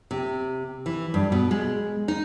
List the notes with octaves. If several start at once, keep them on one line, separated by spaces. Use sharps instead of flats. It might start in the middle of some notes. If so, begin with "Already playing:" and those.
C3
E3
G2
B2
G#3
D#4